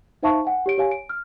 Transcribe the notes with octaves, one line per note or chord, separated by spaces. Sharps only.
D#4 C5 E5 F5 A5 C#6
F#5 G#5
G4 C#5 D7
G4 C#5 F5 G#5
D7
F6